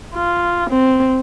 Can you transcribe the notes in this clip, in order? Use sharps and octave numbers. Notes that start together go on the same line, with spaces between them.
F4
C4